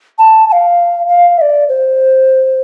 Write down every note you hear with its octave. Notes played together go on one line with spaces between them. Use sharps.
A5
A5
F5
F5
E5
D5
C5